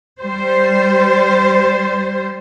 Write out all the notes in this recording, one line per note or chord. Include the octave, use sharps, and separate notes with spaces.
G3 C5